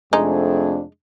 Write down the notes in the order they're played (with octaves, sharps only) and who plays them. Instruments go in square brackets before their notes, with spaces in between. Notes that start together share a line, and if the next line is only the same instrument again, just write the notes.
[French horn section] F2 C3 D4 [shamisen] G#3 D#4 [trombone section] A3 G#4